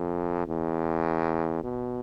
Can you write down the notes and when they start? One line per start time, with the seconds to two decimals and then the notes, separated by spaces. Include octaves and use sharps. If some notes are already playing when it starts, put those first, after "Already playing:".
Already playing: F2
0.47 E2
1.64 B2